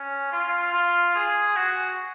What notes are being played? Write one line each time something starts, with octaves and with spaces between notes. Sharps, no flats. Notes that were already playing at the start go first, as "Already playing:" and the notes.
Already playing: C#4
F4
F4
G#4
F#4